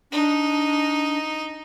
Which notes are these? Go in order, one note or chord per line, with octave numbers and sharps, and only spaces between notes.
D4 D#4